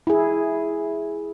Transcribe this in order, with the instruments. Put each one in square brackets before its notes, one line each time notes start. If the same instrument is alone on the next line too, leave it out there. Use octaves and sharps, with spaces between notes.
[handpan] E4 G#4